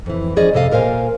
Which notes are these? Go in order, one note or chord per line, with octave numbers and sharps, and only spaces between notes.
F2 E3
F3 C#4 G#4 D5 D#5
F2 C3 A4 D#5 F5
A#2 A#4 C5 F5 G#5